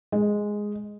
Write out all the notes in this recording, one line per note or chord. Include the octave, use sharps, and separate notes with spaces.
G#3